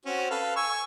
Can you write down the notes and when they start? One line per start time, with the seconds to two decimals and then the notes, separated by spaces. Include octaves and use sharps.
0.05 C4 C#4 F#4
0.31 A4 B4 F5
0.56 G#5 C#6 E6